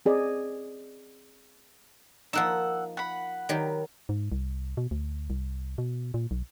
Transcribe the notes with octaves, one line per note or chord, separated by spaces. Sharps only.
C4 G#4 D5 D#5
F3 A#3 D#4 F#5 E6
F#5 B5
D#3 F#3 G4
G#2
C2
B2
D2
C2
B2
A#2
B1